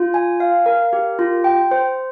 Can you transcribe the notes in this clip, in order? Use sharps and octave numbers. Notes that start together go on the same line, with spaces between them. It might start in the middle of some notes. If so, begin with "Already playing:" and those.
Already playing: F4
G#5
F5
A#4
G4
F4
G5
C5